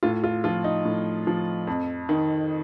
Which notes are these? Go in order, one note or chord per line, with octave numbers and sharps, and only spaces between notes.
A2 F4
F4
F3 F4
D#4
A2
F3
F2
D#3